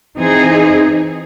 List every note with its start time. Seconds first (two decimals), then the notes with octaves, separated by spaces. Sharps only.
0.17 E3 C4 D#4 G#4